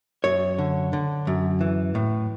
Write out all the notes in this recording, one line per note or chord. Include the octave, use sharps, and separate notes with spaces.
F#2 C#5
D3
D3
F#2
E3
A2